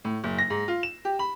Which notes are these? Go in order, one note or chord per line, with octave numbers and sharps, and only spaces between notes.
A2
F#1
A#6
G#2
F4
E7
G4
B5